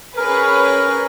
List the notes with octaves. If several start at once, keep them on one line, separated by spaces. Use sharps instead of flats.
C#4 G#4 A#4 B4